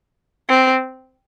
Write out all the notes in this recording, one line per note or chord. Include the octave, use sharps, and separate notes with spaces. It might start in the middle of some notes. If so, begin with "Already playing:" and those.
C4